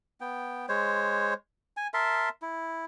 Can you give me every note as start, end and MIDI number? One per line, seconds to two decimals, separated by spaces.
0.21 0.66 59
0.21 0.66 79
0.69 1.34 56
0.69 1.34 72
0.69 1.34 73
1.77 1.87 80
1.94 2.29 70
1.94 2.29 76
1.94 2.29 81
1.94 2.29 84
2.42 2.85 64